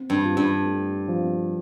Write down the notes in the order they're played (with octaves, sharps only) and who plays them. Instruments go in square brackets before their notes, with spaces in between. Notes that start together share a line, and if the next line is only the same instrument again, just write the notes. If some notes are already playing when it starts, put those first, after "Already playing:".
Already playing: [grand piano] C4
[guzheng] G2
[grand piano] F4
[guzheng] G2
[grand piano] A3
F3